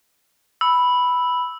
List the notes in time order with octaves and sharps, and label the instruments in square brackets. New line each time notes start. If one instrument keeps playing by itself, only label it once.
[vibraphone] B5 [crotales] E6